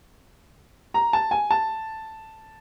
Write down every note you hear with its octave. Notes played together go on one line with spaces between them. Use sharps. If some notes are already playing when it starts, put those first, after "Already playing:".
A#5
A5
G#5
A5